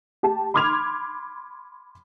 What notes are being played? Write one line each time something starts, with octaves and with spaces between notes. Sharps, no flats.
G4 A5
B5 C6 D6 F6 G#6 F7